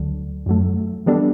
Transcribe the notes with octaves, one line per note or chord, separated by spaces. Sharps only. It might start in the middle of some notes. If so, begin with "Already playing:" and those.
Already playing: D2 D3 F#3
F#2 F#3 A3
E3 G3 B3 D4 A4